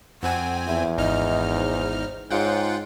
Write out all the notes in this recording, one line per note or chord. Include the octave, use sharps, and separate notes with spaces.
F2 C4 F#5 G#5
E2 E5
G#1 D#4 D#5 F6
C5
G#2 F4 C#5 F#5 G5